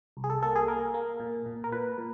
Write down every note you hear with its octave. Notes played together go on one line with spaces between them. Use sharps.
C2
G#4
A4
A#3 A4
G#4
A#3 A#4
A#3
A#2
A#2
A#4
A#2 B4
A#2